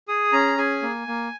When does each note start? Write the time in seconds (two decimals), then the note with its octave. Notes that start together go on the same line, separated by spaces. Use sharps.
0.08 G#4 D#6
0.33 C#4 A#5
0.58 G#4 G#5
0.82 A#3
1.07 A#3